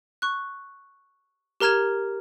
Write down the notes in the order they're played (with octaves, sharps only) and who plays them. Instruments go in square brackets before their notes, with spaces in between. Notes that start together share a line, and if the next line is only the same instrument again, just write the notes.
[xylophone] C#6 F#6
G4 A#4 A#5 F6 G#6 E7